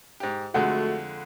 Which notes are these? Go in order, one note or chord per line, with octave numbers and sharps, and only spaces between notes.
G#2 G4
F2 D3 G#3 A3 F#4 F#5